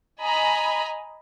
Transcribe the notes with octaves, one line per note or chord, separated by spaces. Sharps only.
D#5 G#5 A#5 B5